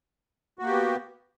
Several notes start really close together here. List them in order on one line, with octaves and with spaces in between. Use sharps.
F#4 A#3 G4 B3